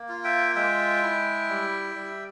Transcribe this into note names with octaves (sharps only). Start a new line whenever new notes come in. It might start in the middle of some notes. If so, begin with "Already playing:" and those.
Already playing: A#3
F4
E5 G5
G#3 E5 G5
E4
G3
G3